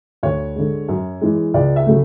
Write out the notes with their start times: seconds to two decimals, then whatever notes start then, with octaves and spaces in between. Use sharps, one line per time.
0.23 D2 C#5
0.56 D3 G#3
0.89 F#2
1.21 E3 G#3
1.54 C#2 D5
1.76 E5
1.86 C#3 F#3 A3